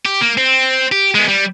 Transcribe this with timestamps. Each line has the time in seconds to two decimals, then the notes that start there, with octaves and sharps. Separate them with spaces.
0.06 G4
0.21 A#3
0.37 C4
0.92 G4
1.15 G#3 B3
1.28 G3